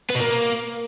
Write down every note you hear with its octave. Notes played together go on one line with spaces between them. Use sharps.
B3
B2
A#3